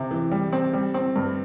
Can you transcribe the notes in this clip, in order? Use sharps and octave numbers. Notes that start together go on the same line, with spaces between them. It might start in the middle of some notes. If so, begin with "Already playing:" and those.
Already playing: C3 C4
E3
G3
C4
G3
C4
G2